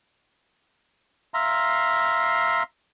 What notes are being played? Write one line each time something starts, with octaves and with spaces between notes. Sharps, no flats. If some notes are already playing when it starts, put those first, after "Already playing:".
E5 F5 A#5 C6